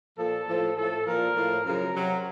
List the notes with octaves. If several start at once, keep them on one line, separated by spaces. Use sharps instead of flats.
A#2 F3 A4
A2 F3
A2 F3 A4
A#2 F3 A#4
A2 F3
F#2 C#3 F3 A#4
C3 F#3